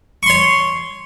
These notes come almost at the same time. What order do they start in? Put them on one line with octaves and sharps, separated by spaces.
C#6 C6 C#5